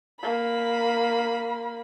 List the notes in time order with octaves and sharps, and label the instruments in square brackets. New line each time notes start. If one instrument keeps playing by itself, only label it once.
[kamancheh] A#3 B5